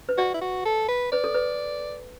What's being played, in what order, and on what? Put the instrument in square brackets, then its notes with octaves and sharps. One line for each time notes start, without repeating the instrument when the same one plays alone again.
[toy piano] B4
[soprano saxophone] F#4 [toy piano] D5
[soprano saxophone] E4
F#4
A4
B4
[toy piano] B4 [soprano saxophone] D5
[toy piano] A4
B4